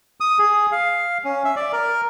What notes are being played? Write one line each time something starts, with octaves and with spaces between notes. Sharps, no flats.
D#6
G#4
F5
C#4
E5
D5
A#4